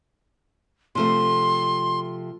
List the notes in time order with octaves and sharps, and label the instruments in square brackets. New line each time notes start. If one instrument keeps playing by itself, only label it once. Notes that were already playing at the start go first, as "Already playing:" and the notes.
[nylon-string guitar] C3 F3 A3 [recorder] C6